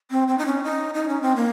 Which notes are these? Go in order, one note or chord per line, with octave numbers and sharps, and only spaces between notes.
C4
C4
D#4
C#4
D#4
D#4
C#4
C4
A#3